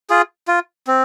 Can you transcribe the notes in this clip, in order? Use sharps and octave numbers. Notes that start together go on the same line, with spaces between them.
F4 G#4
F4
C4